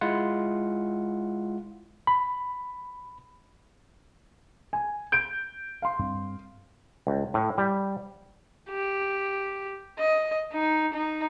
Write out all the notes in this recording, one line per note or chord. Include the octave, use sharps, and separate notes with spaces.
G#3 E4 F4 F#5
B5
G#5
G6 D7
F5 C6
G2 C4
C#2
A2
G3
G4
D#5
D#4
D#4